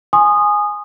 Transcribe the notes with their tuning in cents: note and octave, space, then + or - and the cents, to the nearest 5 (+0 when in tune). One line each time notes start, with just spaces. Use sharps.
G#5 +0 C6 +25 D#6 -15